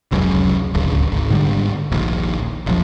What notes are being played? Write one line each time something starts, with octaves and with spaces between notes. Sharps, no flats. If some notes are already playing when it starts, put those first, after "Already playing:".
F1 C#2 F#2 C#3
D1 G1 C#2
G#1
G#2 D3 D#3 G3
D#1 A#1 D#2
E1 A#1 F3